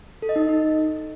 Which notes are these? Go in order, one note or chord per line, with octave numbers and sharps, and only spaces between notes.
A4
D#5
D#4
D#5
D#4